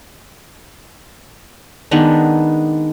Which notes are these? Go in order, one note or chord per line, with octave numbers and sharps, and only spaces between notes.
D#3 G#3 B3 D4